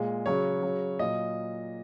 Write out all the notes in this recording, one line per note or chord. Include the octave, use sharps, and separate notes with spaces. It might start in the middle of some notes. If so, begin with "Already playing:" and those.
Already playing: A#2 G#3
C#3 F#3 C#5
C#3 F#3
A#2 F#3 D#5